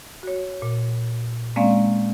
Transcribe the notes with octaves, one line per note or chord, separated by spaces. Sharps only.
F#4 C#5
A#2
G#3 A#3 C4 C#4 D5 F5